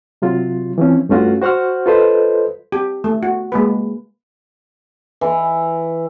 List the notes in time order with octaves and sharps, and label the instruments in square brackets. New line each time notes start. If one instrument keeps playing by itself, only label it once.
[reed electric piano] C3 F#3 F4
E3 F3 C4 C#4
G2 A3 C#4 F4 F#4
F#4 C5 F#5 C#6 F6
F4 A4 B4 C5 D#5
[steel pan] G4
A3
F#4
G#3 A#3 B4
[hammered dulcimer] E3